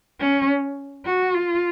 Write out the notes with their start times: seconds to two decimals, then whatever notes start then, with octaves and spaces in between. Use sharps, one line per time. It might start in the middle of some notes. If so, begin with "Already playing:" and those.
0.20 C#4
1.05 F#4
1.34 F4